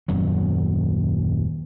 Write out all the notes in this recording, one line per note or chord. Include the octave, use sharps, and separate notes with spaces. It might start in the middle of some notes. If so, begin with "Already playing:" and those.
D#1 F#2 F#3